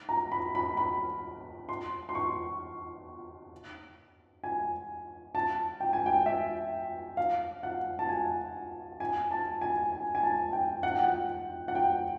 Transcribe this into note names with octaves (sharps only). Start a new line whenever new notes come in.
A#5
B5
B5
B5
C6
C6
C#6
G#5
A5
G5
G#5
G5
E5
F5
F#5
A5
G#5
G#5
A5
G#5
G#5
G#5
A5
G5
F#5
G5
F#5
F#5
G5